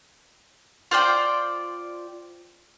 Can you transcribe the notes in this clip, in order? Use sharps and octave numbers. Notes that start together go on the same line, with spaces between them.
F4 C5 D5 G5